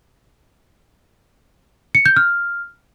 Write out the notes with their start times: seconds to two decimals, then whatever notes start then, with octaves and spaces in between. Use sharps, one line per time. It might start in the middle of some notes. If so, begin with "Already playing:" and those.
1.95 C#7
2.06 G6
2.16 F6